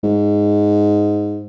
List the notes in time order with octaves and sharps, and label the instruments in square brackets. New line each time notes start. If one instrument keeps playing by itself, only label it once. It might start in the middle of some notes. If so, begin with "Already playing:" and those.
[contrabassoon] G#2